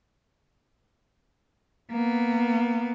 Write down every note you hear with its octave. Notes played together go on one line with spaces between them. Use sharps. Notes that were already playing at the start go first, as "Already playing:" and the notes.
A#3 B3